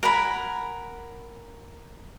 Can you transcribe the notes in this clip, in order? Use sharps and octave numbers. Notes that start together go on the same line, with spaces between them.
A#4 F#5 G#5 B5